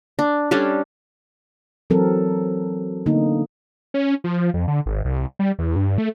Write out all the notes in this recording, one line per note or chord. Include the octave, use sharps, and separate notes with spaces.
D4
G3 C#4 D4 A4
E3 F#3 C4 A4 A#4
D3 A#3 B3 D#4
C#4
F3
F2
D3
G#1
C2
G3
E2
G2
A3